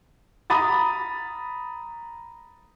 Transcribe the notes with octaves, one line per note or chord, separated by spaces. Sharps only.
A#5 B5 D#6 A6